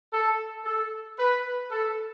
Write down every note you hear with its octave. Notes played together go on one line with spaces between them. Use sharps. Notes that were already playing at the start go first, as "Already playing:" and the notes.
A4
A4
B4
A4